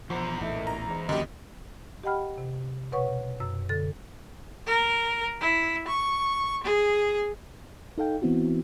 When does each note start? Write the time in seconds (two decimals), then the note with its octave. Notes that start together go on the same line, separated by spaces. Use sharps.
0.10 E2 B2 F3 C5 F#5 A#5
0.41 A#1 A2 D#3 E3 A3
0.67 A#5
0.88 G#2
1.09 F#2 D3 E3 A#3 G4 D#5
2.03 G4 D#5 F#5 G5 B5 F6
2.38 C3
2.92 B2 B4 C#5 F#5 C#6
3.40 F#2 E6
3.69 D3 A4 A6
4.66 A#4
5.41 E4
5.87 C#6
6.64 G#4
7.98 D#4 A4 F5 G5
8.22 E3 B3 C4 E4 F#4